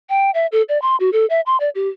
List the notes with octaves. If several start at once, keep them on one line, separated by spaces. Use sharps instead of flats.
G5
E5
A4
D5
C6
F#4
A4
E5
C6
D5
G4